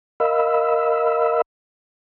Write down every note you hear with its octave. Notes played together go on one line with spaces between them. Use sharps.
A#4 D#5 F5 B5 E6